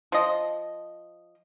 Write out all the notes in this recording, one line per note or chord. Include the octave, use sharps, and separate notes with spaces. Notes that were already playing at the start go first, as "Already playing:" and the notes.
F3 D#5